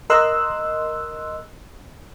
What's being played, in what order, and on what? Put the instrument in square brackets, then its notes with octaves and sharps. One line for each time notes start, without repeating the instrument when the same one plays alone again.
[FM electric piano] A#4 D#5 C6 E6 F#6